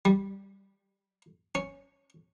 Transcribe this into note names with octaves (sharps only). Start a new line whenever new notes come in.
G3
C#4